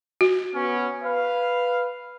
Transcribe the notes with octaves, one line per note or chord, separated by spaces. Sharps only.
F#4
B3 C#4
B4 F5